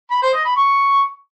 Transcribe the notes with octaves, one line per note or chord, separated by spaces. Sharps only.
B5
C5
D#5
B5
C#6